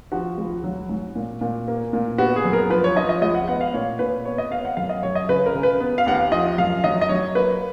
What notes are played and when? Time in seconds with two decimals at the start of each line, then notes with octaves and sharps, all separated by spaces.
0.12 F3 F#4
0.38 C#2
0.64 F#3
0.89 G#2
1.15 A#2
1.41 A#2
1.68 A#3
1.93 A#2
2.18 B3 F#4
2.36 G#4
2.45 F#2
2.53 A#4
2.70 F3 B4
2.84 C#5
2.96 F3 D#5
3.09 D#5
3.22 C#2 D#5
3.35 F#5
3.48 B3 F#5
3.61 F5
3.74 A#2 C#5
3.99 A#2 B4
4.25 B3 C#5
4.38 D#5
4.51 B3 F5
4.65 F#5
4.77 F#2 F5
4.89 D#5
5.03 F#2 C#5
5.15 D#5
5.28 C#3 B4
5.46 A#4
5.55 C#3
5.63 B4
5.80 B3
5.98 F5
6.06 D#2 F#5
6.15 F5
6.32 F3 D#5
6.58 F#2 F5
6.84 F#3 D#5
7.01 D#5
7.09 F#3 C#5
7.35 A#3 B4